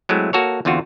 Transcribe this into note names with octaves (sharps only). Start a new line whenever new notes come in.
F#3 G#3 A3 C4 E4
A#3 F#4 A4 C#5
E2 D3 C4 F4 F#4